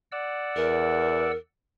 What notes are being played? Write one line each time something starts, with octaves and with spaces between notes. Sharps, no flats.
D5 F#5 E6
E2 A#4